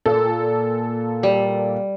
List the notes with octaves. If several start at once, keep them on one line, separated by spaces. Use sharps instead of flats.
A#2 A4
G3